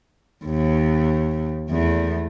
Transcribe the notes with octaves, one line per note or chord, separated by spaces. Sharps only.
D#2
E2 A3